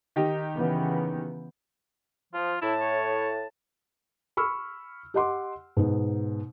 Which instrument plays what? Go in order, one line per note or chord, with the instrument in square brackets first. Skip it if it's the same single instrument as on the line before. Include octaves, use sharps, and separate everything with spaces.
[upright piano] D#3 D#4 G4
[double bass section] C#3 E3 B3
[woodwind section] F3 [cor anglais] F4
[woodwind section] A2 A5 [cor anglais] E4
[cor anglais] C#5
[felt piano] B5 C#6 E6 F6
G4 D#5 F#5 C6 D6
G#2 B2 B3 D#4